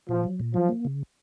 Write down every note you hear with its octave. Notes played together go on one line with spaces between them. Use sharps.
A#2 F3
F#3
A#2
F3 F#3
A#3
C#3